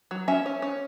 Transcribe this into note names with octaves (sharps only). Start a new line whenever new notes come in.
F#3
C#4 E5
C#4
C#4